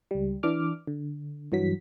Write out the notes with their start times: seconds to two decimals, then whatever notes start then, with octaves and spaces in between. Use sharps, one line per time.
0.11 C#2 G3
0.43 E3 D4 D6 F6
0.87 D3
1.52 G2 E3 F#3 B6